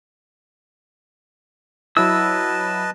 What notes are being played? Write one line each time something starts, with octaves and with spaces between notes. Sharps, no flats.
F#3 E4 B4 D#5 A5 E6